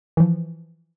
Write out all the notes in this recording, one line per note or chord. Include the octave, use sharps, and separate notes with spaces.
E3 F3